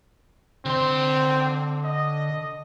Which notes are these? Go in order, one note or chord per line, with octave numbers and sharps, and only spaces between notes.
D3 C4 C6
D#5